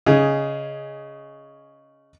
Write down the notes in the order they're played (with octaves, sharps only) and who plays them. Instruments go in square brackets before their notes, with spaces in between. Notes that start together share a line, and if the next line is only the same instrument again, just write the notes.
[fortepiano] C#3 D#4 G#4